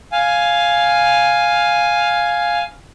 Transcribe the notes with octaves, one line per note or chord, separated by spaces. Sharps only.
F5 G#5